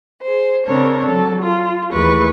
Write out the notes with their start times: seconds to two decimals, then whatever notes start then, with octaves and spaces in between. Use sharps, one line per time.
0.23 G#4 C5
0.65 C#3 C4 D4 A#4 C#5
1.07 F#3 A4
1.42 F4
1.92 D#2 E3 A3 G#4 B4 C#6